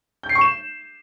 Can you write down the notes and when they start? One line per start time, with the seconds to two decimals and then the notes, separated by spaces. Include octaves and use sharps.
0.23 G6
0.29 C7
0.35 C#6
0.41 E7